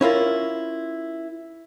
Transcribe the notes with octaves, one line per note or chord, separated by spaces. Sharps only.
C#4 E4 F4 A#4